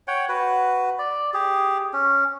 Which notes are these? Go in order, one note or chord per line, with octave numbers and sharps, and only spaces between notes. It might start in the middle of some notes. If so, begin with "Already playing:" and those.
C#5 F#5 G5
F#4 B4
D5
G4 G#4
C#4